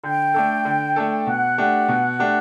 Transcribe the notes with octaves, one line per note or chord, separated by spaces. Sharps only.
D3 G5
A3 D4 A4
D3
A3 D4 A4
B2 F#5
A3 D4 G4
B2
A3 D4 G4